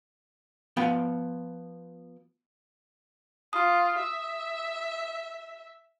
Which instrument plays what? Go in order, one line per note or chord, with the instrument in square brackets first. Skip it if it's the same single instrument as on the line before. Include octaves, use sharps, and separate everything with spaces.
[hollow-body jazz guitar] F3 B3 G5
[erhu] F4 [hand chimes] D#6
[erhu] E5